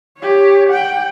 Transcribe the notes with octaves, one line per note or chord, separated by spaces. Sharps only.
G4 C#5
F#5 G5